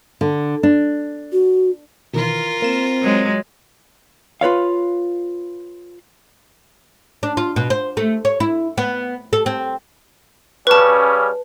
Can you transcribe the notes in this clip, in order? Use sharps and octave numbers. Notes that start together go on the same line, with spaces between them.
D3
D4
F#4
B2 D#3 E3 F4 A#4
A#3 C4 E7
F#3 G#3
F4 B4 C#5 F5
D4
F4
B2
C5
A3
C#5
E4
B3
A4
C4
C#3 G3 C#4 B4 A5